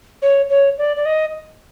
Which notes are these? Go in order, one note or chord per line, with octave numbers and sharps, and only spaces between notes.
C#5
C#5
D5
D5
D#5